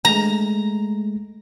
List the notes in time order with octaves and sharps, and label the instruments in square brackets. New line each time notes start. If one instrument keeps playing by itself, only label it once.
[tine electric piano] G#3 A3 [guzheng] A#5